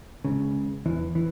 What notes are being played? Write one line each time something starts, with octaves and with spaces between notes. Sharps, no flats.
C#2 C#3
E2 E3
E3